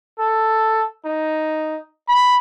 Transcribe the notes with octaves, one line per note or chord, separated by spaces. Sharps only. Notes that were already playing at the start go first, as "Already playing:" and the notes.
A4
D#4
B5